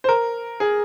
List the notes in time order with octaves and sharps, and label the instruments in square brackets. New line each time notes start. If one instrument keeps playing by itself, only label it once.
[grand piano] C5
A#4
G#4